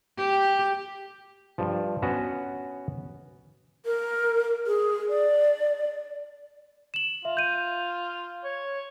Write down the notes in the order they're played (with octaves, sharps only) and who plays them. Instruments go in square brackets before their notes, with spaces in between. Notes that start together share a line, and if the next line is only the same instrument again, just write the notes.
[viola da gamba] G4
[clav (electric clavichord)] G2 F3
B3 C#4 F#4 F#5
[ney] A#4
G#4
D5
[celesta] E7 F#7
[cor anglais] F4 [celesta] E5
[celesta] G6 D#7
[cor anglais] C#5